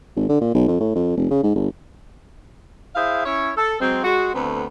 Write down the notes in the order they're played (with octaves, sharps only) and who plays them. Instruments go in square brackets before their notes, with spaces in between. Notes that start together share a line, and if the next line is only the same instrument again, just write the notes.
[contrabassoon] G#1
D3
A#2
B1
F2
A2
F2
F1
C#3
G#2
G1
[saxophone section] E4 G#4 C5 E5 F5
C#4 E4 C#5
A4
F#3 G#3 C4
G#3 F#4
D2 A3 B3 C4